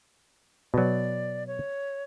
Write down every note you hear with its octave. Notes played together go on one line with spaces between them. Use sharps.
B2 F#3 D5
C#5